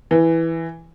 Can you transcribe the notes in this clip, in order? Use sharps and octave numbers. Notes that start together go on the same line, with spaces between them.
E3